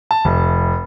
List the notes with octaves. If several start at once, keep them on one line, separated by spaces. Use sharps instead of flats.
A5
F1